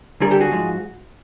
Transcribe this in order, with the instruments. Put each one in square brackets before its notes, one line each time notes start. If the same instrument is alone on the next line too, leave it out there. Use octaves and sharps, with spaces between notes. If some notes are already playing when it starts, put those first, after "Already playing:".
[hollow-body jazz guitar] D2 D3 G3 G#4 A#4
G4 A4
F#4 G#4
G#2 F3 G#3